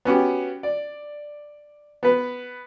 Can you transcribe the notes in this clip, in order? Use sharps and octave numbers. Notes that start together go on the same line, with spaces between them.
B3 C#4 F#4 G4
D5
B3 B4